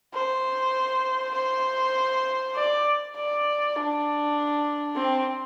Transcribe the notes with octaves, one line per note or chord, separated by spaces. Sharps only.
C5
C5
D5
D5
D4
C4